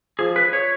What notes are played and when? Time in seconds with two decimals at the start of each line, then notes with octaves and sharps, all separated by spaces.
0.19 F3 G#4
0.36 B4
0.53 C#5